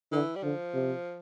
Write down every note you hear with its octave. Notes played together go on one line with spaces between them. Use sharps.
D3 E3
G3
D3 F3
C3